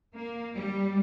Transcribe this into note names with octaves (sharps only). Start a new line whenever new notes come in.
A#3
G3